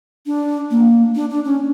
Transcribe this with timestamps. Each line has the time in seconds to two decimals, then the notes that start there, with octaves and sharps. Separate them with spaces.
0.26 D4
0.71 A#3
1.15 D4
1.30 D4
1.45 C#4